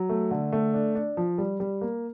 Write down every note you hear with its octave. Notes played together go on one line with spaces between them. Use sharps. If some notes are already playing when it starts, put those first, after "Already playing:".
Already playing: F#3
A3
D3
A3
D4
D4
F3
G3
G3
A#3